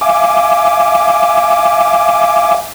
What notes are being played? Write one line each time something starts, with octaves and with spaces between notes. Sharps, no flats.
E5 F5 G#5 D6